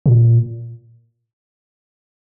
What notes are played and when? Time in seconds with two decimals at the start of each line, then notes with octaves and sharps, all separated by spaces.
0.06 A#2